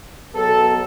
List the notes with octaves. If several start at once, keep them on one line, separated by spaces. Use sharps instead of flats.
B2 F#3 B3 A4